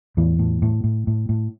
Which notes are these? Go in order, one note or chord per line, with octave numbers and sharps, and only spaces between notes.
E2 A2 E3
A2
A2
A2
A2
A2